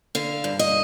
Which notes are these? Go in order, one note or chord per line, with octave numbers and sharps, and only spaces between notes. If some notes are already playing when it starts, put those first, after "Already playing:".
D3 F5
G2
D#5